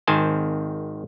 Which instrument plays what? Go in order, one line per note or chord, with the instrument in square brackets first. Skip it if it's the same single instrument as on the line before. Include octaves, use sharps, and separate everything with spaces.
[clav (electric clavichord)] G#1 D#3 C4 C5 G#5 A5